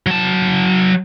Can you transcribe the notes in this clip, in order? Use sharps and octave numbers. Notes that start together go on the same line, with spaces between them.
F#3 A5